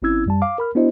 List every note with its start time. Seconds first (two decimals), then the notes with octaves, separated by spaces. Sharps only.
0.02 G#1 C4 C#4 E4 E6 G#6
0.26 F#2 G3 A5
0.42 F5 D6
0.58 A#4 B5 F6
0.75 B3 D4 E4 F#4 C5 D#5